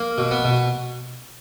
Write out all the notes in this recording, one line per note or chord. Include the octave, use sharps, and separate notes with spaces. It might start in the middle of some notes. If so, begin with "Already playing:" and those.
Already playing: A#3
B2
B3
B2